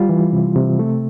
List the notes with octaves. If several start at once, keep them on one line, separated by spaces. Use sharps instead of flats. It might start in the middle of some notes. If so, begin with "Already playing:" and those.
Already playing: G3 F4
E3
C3
C3
A3